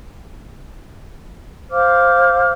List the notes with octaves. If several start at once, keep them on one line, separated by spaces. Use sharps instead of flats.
C5 F5 D6 F6